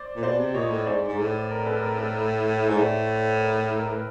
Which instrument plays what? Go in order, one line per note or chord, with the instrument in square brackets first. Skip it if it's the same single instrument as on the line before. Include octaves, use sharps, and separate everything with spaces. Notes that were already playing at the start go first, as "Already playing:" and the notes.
Already playing: [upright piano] C5 D5
[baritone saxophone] A#2
[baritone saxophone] B2 [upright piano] C5 D5
[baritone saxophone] C3
[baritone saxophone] A#2 [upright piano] C#5 D#5
[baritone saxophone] A2
[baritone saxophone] G#2 [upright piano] C5 D5
[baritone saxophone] G#2
A2
[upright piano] A#4
A4 B4
A#4
A4
[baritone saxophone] G#2 [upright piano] C#5
[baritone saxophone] A2 [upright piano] C5 D5
[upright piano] A#4
A4
A#4
B4